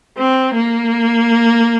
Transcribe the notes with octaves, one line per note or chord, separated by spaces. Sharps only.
C4
A#3